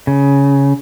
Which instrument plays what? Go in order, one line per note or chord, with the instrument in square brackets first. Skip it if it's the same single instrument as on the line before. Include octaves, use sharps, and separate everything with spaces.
[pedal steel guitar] C#3